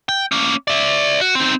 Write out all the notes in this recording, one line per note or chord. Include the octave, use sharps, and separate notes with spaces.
G5
A#3 C#4
D5 E5
F#4
C4 D#4